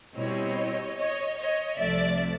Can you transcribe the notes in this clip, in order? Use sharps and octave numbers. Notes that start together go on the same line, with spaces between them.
B2 G3 C4 E4 C#5 D#5
C#5 D#5
C#5 D#5
C2 C3 F3 A3 D5 E5